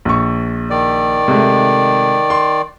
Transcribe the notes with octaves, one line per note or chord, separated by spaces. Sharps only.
A#1 C#6
D#3 D5
C3 G#3 A3
C6